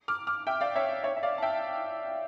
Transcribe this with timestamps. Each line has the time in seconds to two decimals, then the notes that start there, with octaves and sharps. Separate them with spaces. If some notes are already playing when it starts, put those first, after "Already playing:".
0.08 D6 F6
0.27 D6 F6
0.47 E5 G5
0.61 D5 F5
0.75 C#5 E5
1.04 C#5 E5
1.16 E5
1.23 D5 F5
1.38 A5
1.42 E5 G5